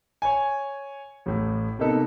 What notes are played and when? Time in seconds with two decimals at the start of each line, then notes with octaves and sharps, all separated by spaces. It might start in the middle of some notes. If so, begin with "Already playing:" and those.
0.22 C#5 G#5
1.26 A1 A2
1.79 C3 A#3 B3 D#4 A4